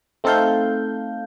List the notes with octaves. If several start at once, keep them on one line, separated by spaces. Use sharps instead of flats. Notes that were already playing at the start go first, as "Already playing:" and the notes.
A3 C4 D#4 A4 F5 G6